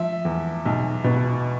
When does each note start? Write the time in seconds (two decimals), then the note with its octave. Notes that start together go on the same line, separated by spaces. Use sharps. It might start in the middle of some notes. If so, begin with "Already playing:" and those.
Already playing: F3 E5
0.25 E2
0.65 B1
1.04 B2